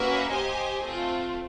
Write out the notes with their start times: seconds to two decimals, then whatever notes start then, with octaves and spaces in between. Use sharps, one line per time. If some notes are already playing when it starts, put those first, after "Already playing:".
Already playing: A#3 C#4 F#4 B4 E5
0.31 G4 C5 D#5 G#5
0.82 A3 C4 F4